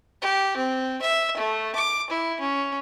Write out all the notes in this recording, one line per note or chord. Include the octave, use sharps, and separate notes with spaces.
G4
C4
E5
A3
D6
E4
C#4